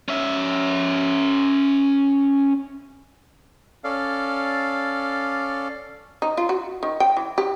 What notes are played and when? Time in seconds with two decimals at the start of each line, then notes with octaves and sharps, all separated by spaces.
0.08 C#4 E5
3.84 C#4 A4 D5 F5
6.22 D#4
6.37 F4
6.49 F#4
6.83 D#3
7.00 G5
7.17 E3
7.38 G4